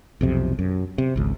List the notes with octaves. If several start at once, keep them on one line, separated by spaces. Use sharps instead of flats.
B1 F2 C3
F#2
C3
G#1 C#2